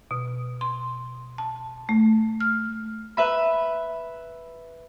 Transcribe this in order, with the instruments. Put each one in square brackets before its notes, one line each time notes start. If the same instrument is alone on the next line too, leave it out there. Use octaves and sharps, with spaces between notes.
[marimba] B2
C6
A5
A3
F6
[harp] B4 E5 B5